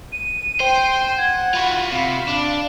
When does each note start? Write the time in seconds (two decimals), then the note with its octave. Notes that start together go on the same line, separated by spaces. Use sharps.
0.12 D#7
0.60 C5 G5 C6
1.18 F#5 G#6
1.54 F4 F#4 B5
1.92 C3 F5
2.28 D4